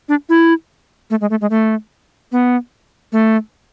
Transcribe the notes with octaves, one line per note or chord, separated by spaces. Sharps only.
D4
E4
A3
G#3
A3
G#3
A3
B3
A3